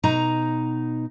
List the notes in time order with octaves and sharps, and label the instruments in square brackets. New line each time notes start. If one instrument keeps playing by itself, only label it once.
[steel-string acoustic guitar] B2 D#4 A#5